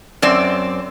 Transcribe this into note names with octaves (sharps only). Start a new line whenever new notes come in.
F#2 C4 D5